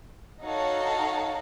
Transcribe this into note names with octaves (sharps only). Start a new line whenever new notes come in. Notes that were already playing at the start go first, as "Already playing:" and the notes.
D#4 F#4 A4 C#5 F5